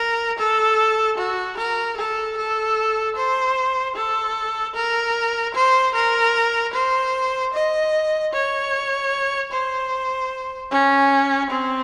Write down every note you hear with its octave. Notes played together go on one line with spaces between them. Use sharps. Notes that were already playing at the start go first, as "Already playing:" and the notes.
Already playing: A#4
A4
F#4
A#4
A4
A4
C5
A4
A#4
C5
A#4
C5
D#5
C#5
C5
C#4
C4